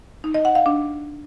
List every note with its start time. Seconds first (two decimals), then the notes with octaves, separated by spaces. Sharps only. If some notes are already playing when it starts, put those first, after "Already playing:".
0.24 D#4
0.34 D#5
0.45 F#5
0.55 F5
0.66 D4